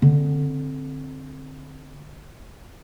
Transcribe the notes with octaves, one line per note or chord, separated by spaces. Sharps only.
D3 C4